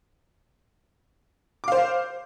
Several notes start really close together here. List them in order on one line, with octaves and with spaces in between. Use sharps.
D6 F5 C5